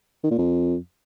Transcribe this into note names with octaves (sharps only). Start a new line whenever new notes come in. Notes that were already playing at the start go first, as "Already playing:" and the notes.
D#3
A#2
F2